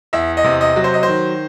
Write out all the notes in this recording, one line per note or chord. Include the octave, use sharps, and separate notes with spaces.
E2 E5
D#5
C3
D#5
F#3
C5
D#5
C5
D#3